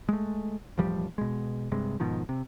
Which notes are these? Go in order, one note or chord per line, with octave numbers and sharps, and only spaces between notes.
G#3 A3
E1 A1 F3 G3
B2 G#3
G2 C3 G#3
G#2 B2 D#3 F3
C3